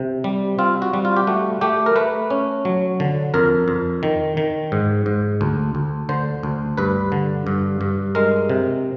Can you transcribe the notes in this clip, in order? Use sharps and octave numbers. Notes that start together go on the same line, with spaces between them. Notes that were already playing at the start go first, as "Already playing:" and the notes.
Already playing: C3
G3
C4 F4
F#4
G3
F4
G4
A3 F#4
A3 G4
A#4
A3 B4
C#4
F#3
D3
F2 A#4
F2
D#3
D#3
G#2
G#2
D2
D2
D3 C5
D2
G2 B4
D3
G2
G2
G#3 A#4
C3